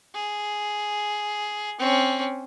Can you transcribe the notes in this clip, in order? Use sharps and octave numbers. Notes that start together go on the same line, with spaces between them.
G#4
C4 C#4